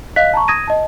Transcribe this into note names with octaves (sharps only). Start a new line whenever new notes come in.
D#5 F5 F#6 B6
A5 A#5 C#6
D#6 G#6 A#6 D#7
D#5 A5